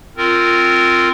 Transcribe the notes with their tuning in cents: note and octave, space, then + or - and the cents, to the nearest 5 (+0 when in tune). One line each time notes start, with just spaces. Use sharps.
C4 +0 F4 -5 A#4 -15